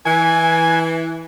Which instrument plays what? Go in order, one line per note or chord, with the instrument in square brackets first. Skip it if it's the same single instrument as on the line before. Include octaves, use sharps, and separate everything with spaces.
[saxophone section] E3 [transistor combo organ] G#5